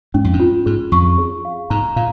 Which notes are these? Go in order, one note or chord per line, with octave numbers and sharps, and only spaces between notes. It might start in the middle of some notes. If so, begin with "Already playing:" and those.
G#2 C#4
F2
G#2
F4
G#2 G#4
F2 C#6
G#4
F5
G#2 A#5
A#2 F5